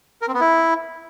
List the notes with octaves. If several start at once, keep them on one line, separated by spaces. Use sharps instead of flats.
A#4
C4
B3
E4